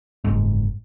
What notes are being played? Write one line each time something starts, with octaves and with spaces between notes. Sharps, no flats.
F#1 G#2